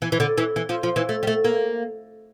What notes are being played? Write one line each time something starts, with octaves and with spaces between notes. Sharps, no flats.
E3
E3
D3
E3
E3
F3
F3
E3
A3
G3
A3
A#3